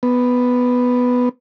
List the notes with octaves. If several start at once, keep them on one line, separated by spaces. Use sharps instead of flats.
B3